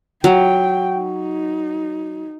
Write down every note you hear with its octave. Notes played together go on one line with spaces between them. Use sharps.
F#3 G5
D#4